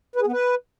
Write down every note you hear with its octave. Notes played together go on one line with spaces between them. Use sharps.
B4
G#4
B3
B4